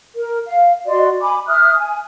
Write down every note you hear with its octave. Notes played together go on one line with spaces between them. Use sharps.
A#4
F5
F#4 D5 D#5 C6
G#5 B5 D6
E5 D#6 F6 F#6
G#5